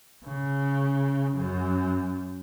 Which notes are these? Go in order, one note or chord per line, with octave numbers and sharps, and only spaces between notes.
C#3
F#2